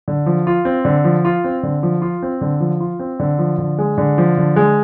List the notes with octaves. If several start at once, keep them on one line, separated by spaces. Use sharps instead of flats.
D3
F3
F4
C4
D3
F3
F4
C4
D3
F3
F4
C4
D3
F3
F4
C4
D3
F3
D3
G#3
D3
F3
D3
G#3